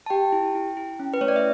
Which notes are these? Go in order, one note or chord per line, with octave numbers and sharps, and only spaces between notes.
A5
G4 G5
E4
E4
E4
C#4
B4
A3 C#5
D5
E5